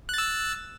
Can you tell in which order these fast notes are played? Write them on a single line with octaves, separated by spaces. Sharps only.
F#6 A6 E6